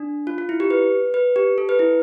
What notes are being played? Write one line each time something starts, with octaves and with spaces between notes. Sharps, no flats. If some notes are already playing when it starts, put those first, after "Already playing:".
Already playing: D4
F4
F4
E4
G4
B4
B4
G4
A4
B4
E4